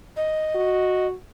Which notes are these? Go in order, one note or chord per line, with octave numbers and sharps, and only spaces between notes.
D#5
F#4